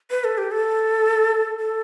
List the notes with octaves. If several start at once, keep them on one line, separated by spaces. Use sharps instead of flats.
B4
A4
G4
A4
A4